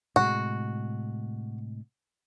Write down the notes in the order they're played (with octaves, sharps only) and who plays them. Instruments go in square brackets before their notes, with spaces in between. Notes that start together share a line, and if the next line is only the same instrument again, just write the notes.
[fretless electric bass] A2 C3 G#3 [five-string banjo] F#4